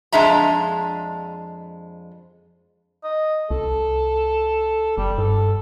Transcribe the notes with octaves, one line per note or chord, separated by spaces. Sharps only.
F2 G#3 D4 F4 E5 A#5
D#5
C2 A4
F#1 G3
G2 A4